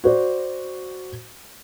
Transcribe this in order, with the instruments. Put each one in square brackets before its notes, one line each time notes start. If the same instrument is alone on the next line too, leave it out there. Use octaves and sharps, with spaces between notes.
[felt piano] F#4 C5 D5